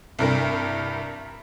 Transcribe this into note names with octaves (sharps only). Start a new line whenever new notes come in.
C2 G2 A#4